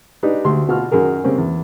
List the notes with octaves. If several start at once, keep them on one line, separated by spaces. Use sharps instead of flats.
D4 D#4 G4 B4
D2 G4 C6
B2 F4 F#4 F6
F#2 D#3 G#4 A#4
C#3 G3 A#3 C4 C#4
E2